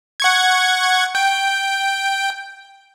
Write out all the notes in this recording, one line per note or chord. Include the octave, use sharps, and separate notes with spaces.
F#5 C#6 G#6
G5